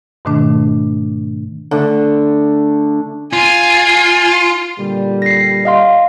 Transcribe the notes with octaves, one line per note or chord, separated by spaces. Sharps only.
G#2 B2 D#3 A3 D4
D3 A3 D4
F4 G#5
A#2 D3 G3
A#6 C7
D#5 F5 C6